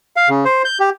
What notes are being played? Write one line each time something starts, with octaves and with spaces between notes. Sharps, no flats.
F5
C#3
C5
G6
G4